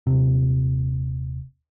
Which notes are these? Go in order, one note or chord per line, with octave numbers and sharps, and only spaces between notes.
D#1 C3